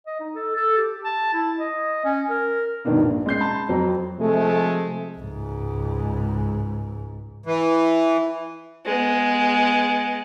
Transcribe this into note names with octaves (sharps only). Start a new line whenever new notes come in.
D#5
D#4
A4
A4
G4
A5
E4
D#5
C#4
A#4
G2 B2 D#3 A#3 D4 D#4
A#1
G#3 C#4 G6 C7
A5 B5 C6
F2 F#3 C4 A#5
C3 F3 G#3 A3
C#2 G#2
E3
G#3 B3